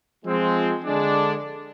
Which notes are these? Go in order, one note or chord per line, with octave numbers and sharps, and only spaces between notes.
F3 G#3 C4
D3 G#3 D4